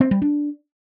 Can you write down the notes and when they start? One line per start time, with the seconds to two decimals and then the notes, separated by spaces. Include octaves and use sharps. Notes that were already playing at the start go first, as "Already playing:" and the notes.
0.01 C4
0.11 G3
0.22 D4